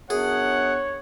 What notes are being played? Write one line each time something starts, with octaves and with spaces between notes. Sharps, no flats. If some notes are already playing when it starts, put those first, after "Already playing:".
F#2 B3 D4 G#4 C#5 F#5